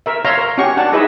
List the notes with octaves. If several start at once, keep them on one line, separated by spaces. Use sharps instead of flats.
A#4 E5
C#5 E5 F5 A#5 C6
A#4
C#4 F#4 G4 C#6
D4 F#5 A5
D#4 E4 G#4 B4 D#5 E5